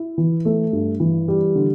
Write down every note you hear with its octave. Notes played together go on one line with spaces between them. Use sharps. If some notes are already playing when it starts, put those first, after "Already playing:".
Already playing: E4
E3
A3
G2
E3
G3
D3